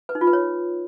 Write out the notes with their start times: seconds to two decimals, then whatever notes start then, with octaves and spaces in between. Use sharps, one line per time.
0.09 B4
0.15 D#4
0.21 F4
0.27 B4
0.33 C#5